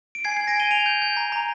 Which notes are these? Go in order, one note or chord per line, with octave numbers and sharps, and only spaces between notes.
D7
G#5 G#6 C7
G#5 G#6 C7
A#6 D7
G#5 D#7 G7
G#5 D7 F7
G6
G6
A#5
A#5